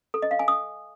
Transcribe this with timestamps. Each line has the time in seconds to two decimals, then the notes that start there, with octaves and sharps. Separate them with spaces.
0.14 A4
0.22 D#5
0.31 F5
0.39 G#5
0.48 D#6